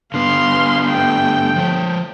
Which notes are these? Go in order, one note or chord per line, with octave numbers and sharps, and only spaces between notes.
D3 B3 F5 C6
A3 G5
F3 C#5